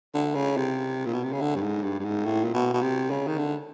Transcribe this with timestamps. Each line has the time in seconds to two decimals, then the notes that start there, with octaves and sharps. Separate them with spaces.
0.14 D3
0.35 C#3
0.57 C3
1.06 A#2
1.14 B2
1.23 C3
1.32 C#3
1.41 D3
1.56 G2
1.63 G#2
1.83 G2
1.99 G2
2.04 G#2
2.25 A2
2.44 A#2
2.54 B2
2.73 B2
2.81 C3
3.10 C#3
3.27 D#3
3.38 D3